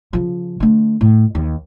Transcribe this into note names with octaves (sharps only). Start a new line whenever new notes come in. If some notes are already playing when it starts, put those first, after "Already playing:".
C#3 F3
D3 A3
A2
D#2